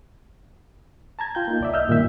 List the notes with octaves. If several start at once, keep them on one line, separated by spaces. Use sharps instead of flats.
A5 A#5 G#6
F4 G5 G6
A#3 D#4
C2 D5 E5
D#5 E5 E6 F6 G6
G2 A#2 D#3 E5